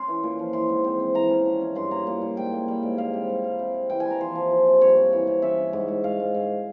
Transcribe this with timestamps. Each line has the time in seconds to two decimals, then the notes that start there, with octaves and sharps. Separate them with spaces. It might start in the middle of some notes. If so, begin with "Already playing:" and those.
Already playing: C#4 C6
0.08 E3
0.23 A#2
0.39 F3
0.53 E3 C6
0.69 G#2
0.84 C4
1.00 C4
1.15 E3 A#5
1.30 C#4
1.46 F3
1.61 C#4
1.75 G2 C6
1.91 A#3 A#5
2.07 A#2
2.22 A#2
2.37 G#2 G5
2.52 A#3
2.68 G3
2.83 G#2
2.98 A#3 F5
3.14 C3
3.29 G3
3.44 G3
3.59 C3
3.75 C3
3.90 E3 G5
4.00 G#5
4.05 E3
4.10 A#5
4.21 F3 C5
4.35 F3
4.51 F3
4.66 C3
4.81 G2 C#5
4.97 C4
5.13 E3
5.27 C3
5.42 C#4 E5
5.58 C#4
5.73 G#2
5.88 G#2
6.04 G#2 F5
6.20 G#2
6.34 G#2